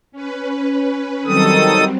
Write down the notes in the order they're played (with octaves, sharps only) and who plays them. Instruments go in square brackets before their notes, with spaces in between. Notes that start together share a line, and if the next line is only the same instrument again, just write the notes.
[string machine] C#4 B4
[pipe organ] D#3 A4 D#6 [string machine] F#3 G3 C4